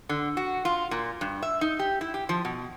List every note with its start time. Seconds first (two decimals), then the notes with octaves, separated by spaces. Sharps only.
0.09 D3
0.37 F#4
0.65 F4
0.91 A#2
1.21 G2
1.43 E5
1.61 D#4
1.79 G4
2.01 E4
2.14 G4
2.29 F3
2.45 B2